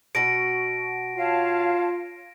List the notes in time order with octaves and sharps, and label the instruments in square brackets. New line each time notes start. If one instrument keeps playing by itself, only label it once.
[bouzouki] B2 F#4 [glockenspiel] A#6 D7
[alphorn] F4 [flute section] C#5 F5 A5